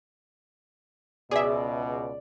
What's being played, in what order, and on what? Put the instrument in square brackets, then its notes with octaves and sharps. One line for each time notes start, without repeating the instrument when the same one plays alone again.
[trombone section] C#2 B2 [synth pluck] G#4 E5 [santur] D5